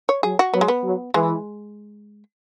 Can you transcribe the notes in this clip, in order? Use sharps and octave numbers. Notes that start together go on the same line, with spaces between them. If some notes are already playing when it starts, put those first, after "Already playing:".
C#5
F#3 G#4
F#4
F#3 B3
G#3
B3
F#3
E3 G#3